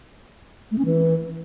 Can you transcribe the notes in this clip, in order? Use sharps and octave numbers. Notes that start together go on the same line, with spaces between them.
A3
C#4
E3